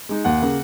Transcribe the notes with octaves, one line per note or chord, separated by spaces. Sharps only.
G#3 D#4
D#2 F#5
C#3 A#3